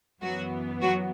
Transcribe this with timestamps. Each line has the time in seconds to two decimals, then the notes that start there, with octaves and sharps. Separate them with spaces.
0.22 F#2 E3 F#3 B3 F#4
0.81 F#3 F#4